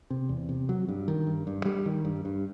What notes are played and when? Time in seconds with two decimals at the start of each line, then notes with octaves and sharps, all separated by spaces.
0.10 C3
0.29 E2
0.49 C3
0.69 F#3
0.88 G2
1.08 D#3
1.27 G2
1.47 G2
1.65 G3
1.86 D#3
2.05 G2
2.25 G2